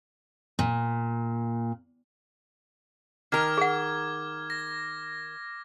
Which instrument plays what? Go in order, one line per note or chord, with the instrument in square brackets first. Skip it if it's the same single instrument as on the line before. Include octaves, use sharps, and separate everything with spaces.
[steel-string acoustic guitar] A#2
[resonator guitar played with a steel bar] D#3 A#4 [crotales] D6 F6 G#6
[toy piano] G#4 F#5
[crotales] A#6